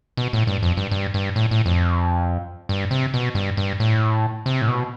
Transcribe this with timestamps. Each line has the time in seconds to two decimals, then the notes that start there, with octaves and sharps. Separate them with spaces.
0.17 B2
0.33 A2
0.47 G2
0.63 F2
0.77 G2
0.91 G2
1.14 G2
1.36 A2
1.51 A2
1.66 F2
2.69 G2
2.91 C3
3.14 B2
3.35 G2
3.57 G2
3.80 A2
4.46 C3
4.62 A2
4.68 B2